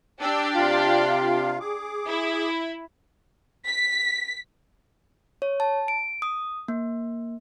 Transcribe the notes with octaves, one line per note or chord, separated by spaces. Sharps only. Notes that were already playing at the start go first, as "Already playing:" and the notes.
D4 G4 D6 E6
C3 F4 F5
G#4 D6
E4
B6
C#5
A5
D7
D#6
A#3